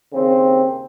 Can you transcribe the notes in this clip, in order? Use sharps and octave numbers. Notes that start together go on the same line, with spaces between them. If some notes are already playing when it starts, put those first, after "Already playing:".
D#2 C#3 C4